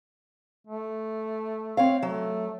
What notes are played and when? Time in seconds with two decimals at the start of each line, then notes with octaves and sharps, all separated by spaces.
0.67 A3
1.77 C4 C#5 F5
2.03 F#3 A3